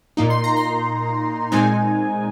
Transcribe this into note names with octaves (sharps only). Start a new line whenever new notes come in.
A#2 A#3 D#4
C6
A#5
C6
A#2 G#3 C4 D#4 G#5